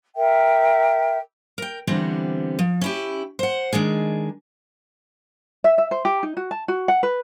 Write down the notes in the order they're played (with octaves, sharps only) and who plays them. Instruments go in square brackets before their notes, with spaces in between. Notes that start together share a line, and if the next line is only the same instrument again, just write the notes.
[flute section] A#4 E5 G5
[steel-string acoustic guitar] A#4 G5
D3 E3 G3 B3 C4
F3
C#4 E4 G4
C5 F#5
D#3 G#3 D4 G#4
[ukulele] E5
E5
C5
G4
D#4
F#4
A5
F#4
F#5
B4